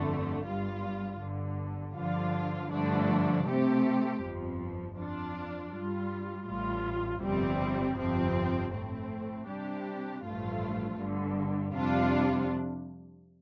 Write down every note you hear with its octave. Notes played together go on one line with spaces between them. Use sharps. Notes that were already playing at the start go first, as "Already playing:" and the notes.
Already playing: G1 F2 D3 A3
G1 G2 G3 F4
G1 G2 D3
G2 D3 F3 D4 F4
G2 D3 F3 A3 D4
C3 A3 C4 G4
G1 F2 F3
F2 F3 D4 F4
G2 G3 F4
A1 A2 G3 F4
G1 F2 C3 G3 C4
G1 F2 C3 F3 C4
A2 A3 C4
C3 G3 D4 G4
A1 G2 F3 A3 F4
G1 G2 D3
F2 C3 G3 D4 F4